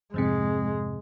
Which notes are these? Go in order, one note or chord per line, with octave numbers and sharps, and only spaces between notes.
F2 G#2 C3 G#3